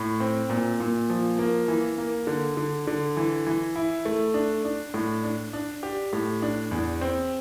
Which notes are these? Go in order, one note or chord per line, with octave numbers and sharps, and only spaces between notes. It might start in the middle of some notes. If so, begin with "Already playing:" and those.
Already playing: A2
C4
A#2
A#2
F3
A#3
E3
A#3
D3
D3
D3
E3
E3
E4
A3
D4
D4
A2
D4
D4
G4
A2
D4
E2
C4